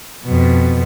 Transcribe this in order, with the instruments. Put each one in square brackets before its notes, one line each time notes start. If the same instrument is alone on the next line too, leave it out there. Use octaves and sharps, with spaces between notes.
[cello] F2 B2